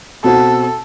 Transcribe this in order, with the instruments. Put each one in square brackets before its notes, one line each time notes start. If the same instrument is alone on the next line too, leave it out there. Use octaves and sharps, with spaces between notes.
[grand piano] B2 C4 F#4 [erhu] A4